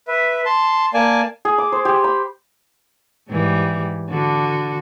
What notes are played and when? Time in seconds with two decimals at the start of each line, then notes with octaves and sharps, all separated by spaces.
0.08 B4 E5
0.46 A5 C6
0.94 A#3 D5 G#5 A5
1.45 G#4
1.58 D6
1.72 C5
1.85 G4
2.04 B5
3.29 G#2 E3 G3
4.10 D3 D4 F#4